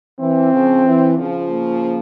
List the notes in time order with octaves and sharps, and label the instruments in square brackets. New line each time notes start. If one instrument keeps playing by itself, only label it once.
[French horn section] E3 [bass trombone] C4
[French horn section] C#3 F3
E3
C#3 F3
[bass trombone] A#3